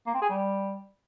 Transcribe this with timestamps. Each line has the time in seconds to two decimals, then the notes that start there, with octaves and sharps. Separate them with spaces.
0.06 A#3
0.14 C4
0.22 G#4
0.29 G3